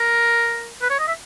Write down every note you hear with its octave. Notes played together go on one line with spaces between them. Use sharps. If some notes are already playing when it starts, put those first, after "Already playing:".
Already playing: A#4
B4
C#5
D#5
E5